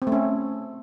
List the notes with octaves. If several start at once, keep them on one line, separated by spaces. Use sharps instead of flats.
C4
A3
C#4